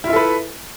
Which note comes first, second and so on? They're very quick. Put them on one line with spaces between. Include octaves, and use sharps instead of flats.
E4 F4 E5 A4 B4